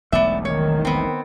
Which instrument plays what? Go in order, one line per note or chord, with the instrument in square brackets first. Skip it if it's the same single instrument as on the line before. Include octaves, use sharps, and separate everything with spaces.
[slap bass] E1 B1 A3 [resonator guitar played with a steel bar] B3 D5 E5
[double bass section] D#3 [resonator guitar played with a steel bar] C#5
[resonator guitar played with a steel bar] B3 C4